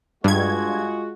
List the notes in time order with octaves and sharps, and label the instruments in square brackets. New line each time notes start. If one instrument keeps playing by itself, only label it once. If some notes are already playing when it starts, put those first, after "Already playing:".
[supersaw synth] G2 G#6 [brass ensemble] G#3 F4 F#4